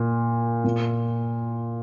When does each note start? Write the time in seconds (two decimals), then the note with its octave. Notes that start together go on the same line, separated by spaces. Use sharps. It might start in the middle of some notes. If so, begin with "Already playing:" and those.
Already playing: A#2
0.64 A#2